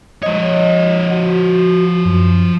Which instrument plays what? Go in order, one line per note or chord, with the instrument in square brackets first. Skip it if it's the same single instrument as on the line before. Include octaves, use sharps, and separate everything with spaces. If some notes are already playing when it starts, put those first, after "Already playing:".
[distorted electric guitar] F3 C#5 [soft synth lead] D#5
[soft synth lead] F#4
F#2